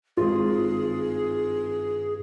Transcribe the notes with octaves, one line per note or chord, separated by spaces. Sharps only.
G#1 G2 F4 G#4